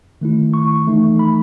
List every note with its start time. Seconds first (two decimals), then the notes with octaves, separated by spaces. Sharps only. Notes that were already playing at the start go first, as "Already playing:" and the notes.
0.21 D#3 A3 E4
0.54 C#6
0.87 E3 A3 D#4
1.19 B5